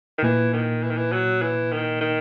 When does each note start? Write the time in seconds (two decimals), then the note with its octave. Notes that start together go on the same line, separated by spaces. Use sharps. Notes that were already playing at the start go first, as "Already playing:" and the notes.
0.18 D#3
0.23 A#2 E3 A#3
0.53 D#3
0.83 E3
0.90 D#3
0.97 E3
1.12 F#3
1.42 E3
1.72 D#3
2.01 D#3